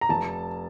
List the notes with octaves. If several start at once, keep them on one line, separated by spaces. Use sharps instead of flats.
A#5
F1 A5